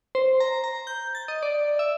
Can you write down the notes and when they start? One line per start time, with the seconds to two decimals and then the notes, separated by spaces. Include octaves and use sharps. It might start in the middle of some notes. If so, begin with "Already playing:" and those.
0.15 C5
0.40 A#5
0.64 A#5
0.87 G6
1.15 A6
1.28 D#5
1.43 D5
1.79 E5